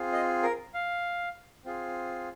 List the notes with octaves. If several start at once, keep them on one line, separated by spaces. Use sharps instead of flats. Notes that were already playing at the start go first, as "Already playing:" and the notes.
Already playing: C4 F4 G#4
D#5
A#4
F5
C4 F4 G#4